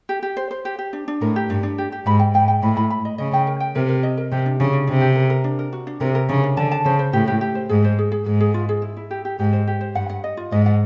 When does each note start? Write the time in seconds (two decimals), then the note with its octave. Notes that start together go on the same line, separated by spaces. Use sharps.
0.09 G4
0.23 G4
0.37 C5
0.51 C5
0.65 G4
0.79 G4
0.93 D4
1.08 D4
1.21 A2 A#4
1.36 G4
1.49 G2 D4
1.63 D4
1.78 G4
1.92 G4
2.06 G#2 B5
2.19 G5
2.34 G#2 G5
2.48 G5
2.62 A2 B5
2.77 B5
2.90 B5
3.05 D#5
3.18 C#3 D#5
3.33 G5
3.47 A#4
3.60 G5
3.75 C3 A#4
3.89 A#4
4.03 D#5
4.17 A#4
4.32 C3 G4
4.46 D4
4.60 C#3 D4
4.73 D4
4.87 C3 D4
5.01 G4
5.15 A#4
5.30 A#4
5.44 D4
5.59 A#4
5.73 F#4
5.87 D4
6.00 C3 A#4
6.15 A#4
6.29 C#3 D4
6.44 D4
6.57 D3 A5
6.71 A5
6.85 C#3 C5
6.99 C5
7.13 A2 G4
7.27 G4
7.41 G4
7.55 C5
7.69 G#2 G#4
7.84 C5
7.99 G#4
8.12 G#4
8.26 G#2 G#4
8.40 G#4
8.54 F4
8.69 G#4
8.82 E4
8.97 E4
9.11 G4
9.25 G4
9.39 G#2 G4
9.53 C5
9.67 G4
9.81 C5
9.95 G2 F#5
10.10 F#5
10.24 D#5
10.37 F4
10.52 G#2 D#5
10.66 F#5